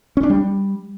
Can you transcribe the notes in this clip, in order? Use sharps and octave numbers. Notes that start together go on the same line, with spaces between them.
C#4
D4
G3